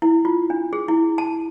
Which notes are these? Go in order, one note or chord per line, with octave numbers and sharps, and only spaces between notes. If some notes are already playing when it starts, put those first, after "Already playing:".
E4
F4
D4
G#4
E4
A5